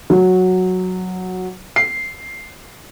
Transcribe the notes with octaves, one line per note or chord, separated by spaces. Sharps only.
F#3
C7